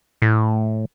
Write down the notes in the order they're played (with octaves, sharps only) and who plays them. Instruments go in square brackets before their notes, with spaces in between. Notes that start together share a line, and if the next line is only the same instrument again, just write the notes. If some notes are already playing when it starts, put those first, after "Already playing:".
[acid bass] A2